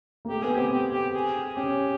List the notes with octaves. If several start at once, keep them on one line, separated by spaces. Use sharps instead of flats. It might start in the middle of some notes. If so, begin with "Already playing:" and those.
A#3
A3 G4
B3 G#4
C4 G4
G4
G4
G#4
C#4 G4